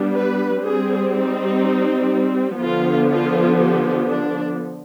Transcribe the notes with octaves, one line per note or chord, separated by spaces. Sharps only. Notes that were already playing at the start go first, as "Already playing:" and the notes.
Already playing: G3 B3 D4
B4
G3 C4 G#4
D#4
D3 F3 B3 F4
F4
G4
D4